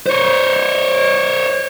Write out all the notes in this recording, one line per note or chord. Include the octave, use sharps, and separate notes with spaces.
C5 C#5